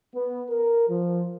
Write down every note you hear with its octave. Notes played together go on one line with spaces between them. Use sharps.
B3
A#4
F3